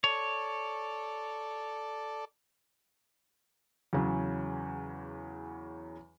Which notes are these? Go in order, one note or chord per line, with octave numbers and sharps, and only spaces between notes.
A4 C#5 D5
E2 C#3 F#3